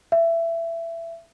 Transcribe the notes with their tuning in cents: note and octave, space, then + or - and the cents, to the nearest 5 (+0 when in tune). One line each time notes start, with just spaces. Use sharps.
E5 +20